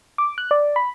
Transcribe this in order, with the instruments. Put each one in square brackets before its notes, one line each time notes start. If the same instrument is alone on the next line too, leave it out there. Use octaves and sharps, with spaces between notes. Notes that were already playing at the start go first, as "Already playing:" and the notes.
[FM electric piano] D6
F#6
D5
B5